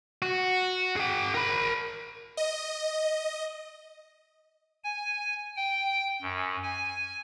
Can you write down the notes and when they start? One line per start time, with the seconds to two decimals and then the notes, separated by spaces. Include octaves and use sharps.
0.22 F#4
0.96 G#4 G5
1.35 A#4 B5
2.37 D#5
4.84 G#5
5.56 G5
6.22 F#2
6.63 G#5